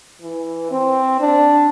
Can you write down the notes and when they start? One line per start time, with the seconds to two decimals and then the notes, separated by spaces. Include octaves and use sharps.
0.22 E3
0.71 C4
1.20 D4